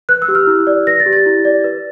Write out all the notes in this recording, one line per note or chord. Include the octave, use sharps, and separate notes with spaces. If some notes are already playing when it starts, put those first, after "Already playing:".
B4 F#6
E6
G4
F6
E4
D5
B4 A#6
A6
G4
A6
E4
D5
B4